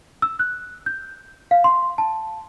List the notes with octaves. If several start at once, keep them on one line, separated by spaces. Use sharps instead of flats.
E6
F#6
G6
F5
C6
A5